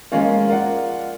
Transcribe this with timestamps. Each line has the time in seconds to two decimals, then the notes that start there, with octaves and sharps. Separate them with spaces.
0.12 F3 G#3 A#3 C#4 F4
0.49 F4 A#4 D5 F#5